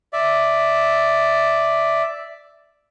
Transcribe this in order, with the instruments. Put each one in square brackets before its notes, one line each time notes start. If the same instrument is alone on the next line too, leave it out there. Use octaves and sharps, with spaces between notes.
[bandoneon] D5 E5